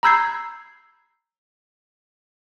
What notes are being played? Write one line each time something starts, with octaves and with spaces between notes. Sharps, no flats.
A#5 B5 E6 G6 G#6 C7